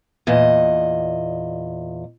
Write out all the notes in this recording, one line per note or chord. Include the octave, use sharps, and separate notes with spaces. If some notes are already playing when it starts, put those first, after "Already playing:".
E2 A#2 D#5